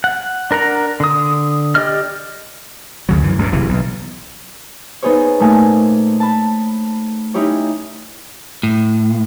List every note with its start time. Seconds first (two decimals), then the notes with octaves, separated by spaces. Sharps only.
0.04 F#5
0.51 D4 A#4 F#5 A#5
1.00 D3 D#6
1.75 G4 D5 D#5 F6
3.09 D2 C#3 F#3
3.22 F#2 E3
3.39 C#2 G2 A#2
3.52 F#1 C3 E3
3.69 B1
5.03 B3 D#4 G#4 C5 C#5
5.40 A#2 A3 D#4 G#5 A5 D#6
6.20 A5 B5
7.34 C#4 D#4 E4 G4 C#5
8.63 A2